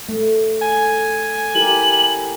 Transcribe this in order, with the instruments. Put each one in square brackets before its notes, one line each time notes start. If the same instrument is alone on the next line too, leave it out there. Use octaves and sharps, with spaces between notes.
[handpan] A3
[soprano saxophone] G#5
[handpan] E4 G4 A#4 [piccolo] F#7